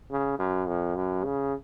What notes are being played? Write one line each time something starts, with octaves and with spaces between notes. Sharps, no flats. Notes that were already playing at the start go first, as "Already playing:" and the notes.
C#3
F#2
F2
F#2
C#3